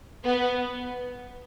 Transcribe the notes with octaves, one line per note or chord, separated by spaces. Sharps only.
B3